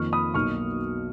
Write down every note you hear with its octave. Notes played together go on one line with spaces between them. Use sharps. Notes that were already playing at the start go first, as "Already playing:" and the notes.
Already playing: F2 D#3 A#3 C#6 F6
B5 D#6
B1 B2 F#3 A#3 D#4 C#6 F6